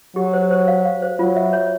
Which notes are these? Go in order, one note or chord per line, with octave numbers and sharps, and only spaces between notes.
F#3 G4
C5
C5
F5
F5
C5
F#3 F4
E5
C#5